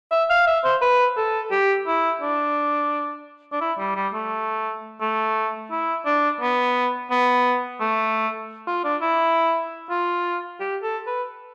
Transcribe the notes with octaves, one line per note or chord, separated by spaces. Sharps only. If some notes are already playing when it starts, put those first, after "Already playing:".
E5
F5
E5
C5
B4
A4
G4
E4
D4
D4
E4
G3
G3
A3
A3
E4
D4
B3
B3
A3
F4
D4
E4
F4
G4
A4
B4